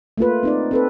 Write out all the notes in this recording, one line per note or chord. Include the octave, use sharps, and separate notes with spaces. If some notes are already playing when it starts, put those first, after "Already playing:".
A3 A#3 F4 B4
C4 D#4 D5
C4 A4 B4